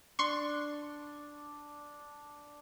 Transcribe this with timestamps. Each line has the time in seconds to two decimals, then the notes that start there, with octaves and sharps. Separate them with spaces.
0.19 D4 C6 C#6